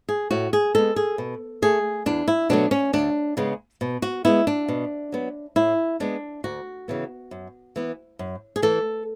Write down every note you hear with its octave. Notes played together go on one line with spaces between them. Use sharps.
G#4
A2 F#4
G#4
G#3 B3 A4
G#4
B2
A3 G#4
E2 D4
E4
B2 F#3 A3 D4
C#4
D2 D4
C#3 G#3 B3
B2
F#4
G#3 B3 E4
D4
B2
F#3 B3
A2 E4
G#3 B3 D4
D2 F#4
C#3 E3 B3
F#2
E3 B3
F#2
G#4
E3 A3 A4